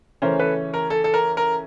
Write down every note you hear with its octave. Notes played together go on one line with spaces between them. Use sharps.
C#3 E3 A3 C#4 A#4 C5
A4 B4
A#4
A4
A4
A#4
A#4